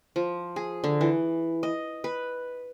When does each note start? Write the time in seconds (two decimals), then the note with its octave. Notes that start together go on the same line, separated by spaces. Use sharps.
0.16 F3
0.56 G#4
0.84 D3
1.01 E3
1.63 D#5
2.04 B4